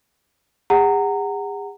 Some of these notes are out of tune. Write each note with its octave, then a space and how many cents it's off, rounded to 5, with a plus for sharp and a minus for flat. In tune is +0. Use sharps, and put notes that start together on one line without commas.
G#4 -40 F#5 +15 A#5 -20